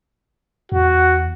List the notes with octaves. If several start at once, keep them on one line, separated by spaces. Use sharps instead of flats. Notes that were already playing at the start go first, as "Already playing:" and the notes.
E2 F#4